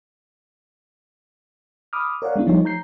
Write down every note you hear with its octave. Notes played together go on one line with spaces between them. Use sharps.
B5 D6 D#6 F6
A#4 C#5 D5 F5 F#5
G#3 B3 D4 E4
F3 G3 A3 D#4 F4 C#5
A#5 G6 C7